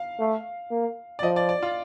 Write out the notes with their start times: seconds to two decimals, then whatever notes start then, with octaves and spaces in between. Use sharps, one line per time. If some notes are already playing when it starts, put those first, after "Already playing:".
Already playing: F5
0.19 A3
0.71 A#3
1.19 D5
1.23 F3 D#5
1.36 D5
1.49 D5
1.63 F4